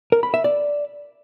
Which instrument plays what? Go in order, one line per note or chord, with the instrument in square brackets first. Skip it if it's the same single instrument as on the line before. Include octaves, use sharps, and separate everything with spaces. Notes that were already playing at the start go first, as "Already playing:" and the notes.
[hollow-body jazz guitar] A#4
B5
E5
D5